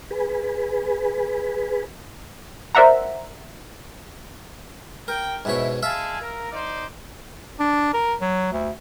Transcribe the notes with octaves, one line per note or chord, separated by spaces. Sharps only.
G#4 B4
A#4 C5 D5 E5 F#5 A#5
A#4 G5
G#2 B2 E4 C#5
G#3 E5 F5 G#5 A5
A#4
D#4 C5 D5
D4
A#4
F#3
D2